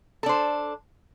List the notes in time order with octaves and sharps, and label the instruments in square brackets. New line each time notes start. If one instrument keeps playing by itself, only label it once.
[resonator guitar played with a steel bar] A4
D4
C5